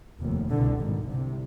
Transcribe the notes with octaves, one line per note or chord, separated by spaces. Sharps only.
F1 D#2
C2 B2 D3
G#1 G#2
C2 C3